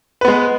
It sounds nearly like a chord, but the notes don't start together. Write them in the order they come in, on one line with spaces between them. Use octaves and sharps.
B4 B3 G#3